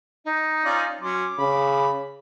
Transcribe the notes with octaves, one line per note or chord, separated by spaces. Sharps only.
D#4
C#4 F4 D5
F#3 C#4 C6 D6
C#3 B5